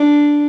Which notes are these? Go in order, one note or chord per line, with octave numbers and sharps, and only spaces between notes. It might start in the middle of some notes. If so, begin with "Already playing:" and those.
Already playing: D4